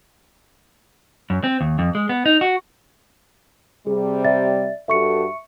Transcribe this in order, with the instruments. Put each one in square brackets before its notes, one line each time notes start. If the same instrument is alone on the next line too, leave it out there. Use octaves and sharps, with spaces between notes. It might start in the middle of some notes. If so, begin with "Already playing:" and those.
[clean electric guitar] F#2
C4
D#2
F2
G#3
B3
D#4
F#4
[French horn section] C3 G3 [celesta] G#4
[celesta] D5 E5 A6
[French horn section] G2 F#4 A4 [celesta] E5 C#6 C#7